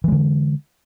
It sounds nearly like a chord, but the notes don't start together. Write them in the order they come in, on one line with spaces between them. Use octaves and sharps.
E3 G#3 D3